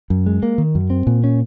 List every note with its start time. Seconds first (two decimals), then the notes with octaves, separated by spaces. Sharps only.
0.10 F#2
0.26 G#3
0.43 A#3
0.58 D#3
0.75 F#2
0.90 C4
1.07 A#2
1.24 C#4